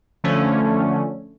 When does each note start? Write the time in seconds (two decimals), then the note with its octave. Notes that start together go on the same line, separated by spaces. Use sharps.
0.24 D3 F3 A3 C#4